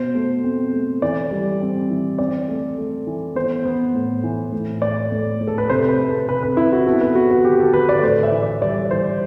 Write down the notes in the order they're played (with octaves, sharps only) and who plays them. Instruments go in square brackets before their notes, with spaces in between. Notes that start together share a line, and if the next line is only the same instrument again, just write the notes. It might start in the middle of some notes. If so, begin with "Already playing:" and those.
Already playing: [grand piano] B2 C5
A3
C4
A3
E3 D5
G3
C4
E3
C4 D5
A3
A3
E3
B3 C5
B3
A2
E3
A2
A2 D5
A2
A2
A4
B4
C3 C5
B4
C4
A4
C3 B4
B4
C3 E4
F#4
B3 A4
B4
B3 F#4
F#4
D3 G4
A4
D3 B4
D5
A2 C5
E5
E3
D5
G3 D5
E3 C5